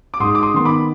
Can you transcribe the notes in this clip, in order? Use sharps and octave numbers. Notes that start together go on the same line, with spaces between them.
D6
G#2 C6 D#6
D6
C6 D#6
D#3 B3 C6
B5 D6